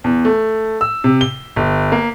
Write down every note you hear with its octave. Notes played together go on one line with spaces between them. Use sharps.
E2
A3
E6
C3
G7
G1
A#3